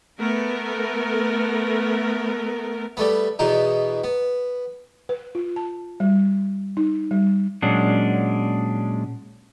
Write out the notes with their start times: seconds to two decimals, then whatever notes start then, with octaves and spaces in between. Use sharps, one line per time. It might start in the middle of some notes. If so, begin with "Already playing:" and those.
0.21 A3 B3 A4 A#4
2.97 G3 A3 B3
3.39 E2 B2 B3 D#4
4.04 B3
5.09 B4
5.35 F4
5.56 A5
6.00 G3
6.77 D#4
7.11 G3
7.62 A#2 F#3 G#3 C#4 D4